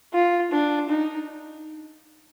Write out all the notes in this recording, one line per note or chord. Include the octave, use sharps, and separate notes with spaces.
F4
D4
D#4